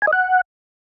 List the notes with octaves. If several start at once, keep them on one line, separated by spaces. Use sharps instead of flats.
G#5
D#5
F#5